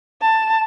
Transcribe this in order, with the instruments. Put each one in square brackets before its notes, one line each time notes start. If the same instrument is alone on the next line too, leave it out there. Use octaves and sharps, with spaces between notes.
[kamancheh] A5